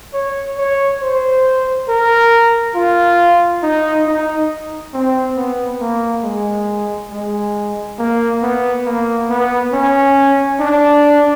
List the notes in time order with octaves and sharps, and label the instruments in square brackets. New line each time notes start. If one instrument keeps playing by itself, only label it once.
[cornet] C#5
C#5
C5
A#4
F4
D#4
D#4
C4
B3
A#3
G#3
G#3
A#3
B3
A#3
B3
C#4
D4